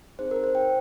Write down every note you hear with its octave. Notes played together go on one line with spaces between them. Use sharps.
C4 D#4 G#4 C5
A#4
C5
G5